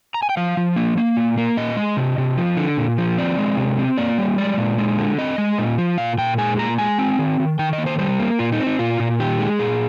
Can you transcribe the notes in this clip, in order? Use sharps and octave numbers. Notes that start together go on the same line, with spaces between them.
A#5
G#5
G5
F3 F5
F3
A#3
A#3
A#2
A#3
A#2 D#5
G#3
C3
C3
F3
D3
A#2
F3
C4 D5
G#3
C3
C4
A#3 D5
G3
G#3 D5
A#2
G#3
D3
C4 D#5
G#3
A#2
F3
A#2 F5
A#2 G5
G#3 G#5
A#2 A#5
G#3 G#5
C4
D#3
D#3
D#3 G5
D#5
A#3
C5
G3 C5
A#3
A#2 F4
D#4
C4
D#4
A#2 F4
A#2
D#3 G4
G#3
A#2 G#4